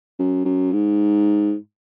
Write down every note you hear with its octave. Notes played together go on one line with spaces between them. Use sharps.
F#2
F#2
G#2